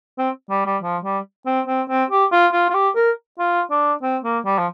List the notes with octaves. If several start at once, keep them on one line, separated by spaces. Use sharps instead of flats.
C4
G3
G3
F3
G3
C4
C4
C4
G4
F4
F4
F4
G4
A#4
F4
D4
C4
A#3
G3
F3